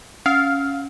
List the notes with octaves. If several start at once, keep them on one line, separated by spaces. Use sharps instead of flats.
C#4 F5